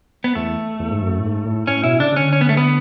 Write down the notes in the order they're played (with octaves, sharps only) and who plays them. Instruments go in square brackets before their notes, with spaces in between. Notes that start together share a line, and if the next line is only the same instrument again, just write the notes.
[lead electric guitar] B3
[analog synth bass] E2 [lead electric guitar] A3
[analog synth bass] E2
G#2
F#2
A2
G#2
A2
[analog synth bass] A2 [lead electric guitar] C#4
[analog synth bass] B2 [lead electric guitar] E4
[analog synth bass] C#3 [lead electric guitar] D4
[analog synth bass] C#3
[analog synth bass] D3 [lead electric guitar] C#4
[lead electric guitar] C#4
B3
A3
B3